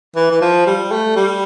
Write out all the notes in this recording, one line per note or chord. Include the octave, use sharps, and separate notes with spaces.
E3
E3
F3
G3
A3
G3